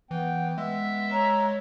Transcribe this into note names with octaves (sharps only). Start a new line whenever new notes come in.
E3 B3 G5
G#3 B3 E5
C#5 A#5